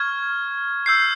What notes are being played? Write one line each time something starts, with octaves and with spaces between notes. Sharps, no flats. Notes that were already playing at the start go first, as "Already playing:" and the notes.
Already playing: C#6 F6 G#6
E6 G6 C7